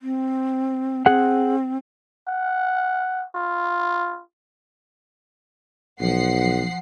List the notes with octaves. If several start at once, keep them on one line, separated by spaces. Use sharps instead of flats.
C4
C4 G#4 F#5
F#5
F4
B1 F3 F#5 C7